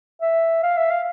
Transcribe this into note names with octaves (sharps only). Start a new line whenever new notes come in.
E5
F5
E5
F5